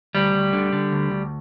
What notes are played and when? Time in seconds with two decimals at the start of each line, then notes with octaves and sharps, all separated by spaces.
0.15 D2 G3
0.34 D2
0.53 D3
0.73 D3
0.92 D2
1.11 D2